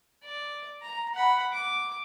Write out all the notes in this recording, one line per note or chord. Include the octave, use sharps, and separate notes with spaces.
D5
A#5
F#5 B5
D6